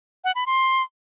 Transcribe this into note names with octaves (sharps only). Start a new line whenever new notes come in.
F#5
B5
C6